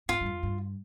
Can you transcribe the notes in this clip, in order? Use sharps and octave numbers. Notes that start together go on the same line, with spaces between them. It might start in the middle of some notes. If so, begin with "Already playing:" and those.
G#2 F4
G2
F2
G2